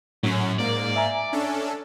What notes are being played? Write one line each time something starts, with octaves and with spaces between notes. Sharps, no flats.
F#2 A2 F#3 C#4
G#2 A#3 D5
E5 G#5 A#5
C#4 D4 A4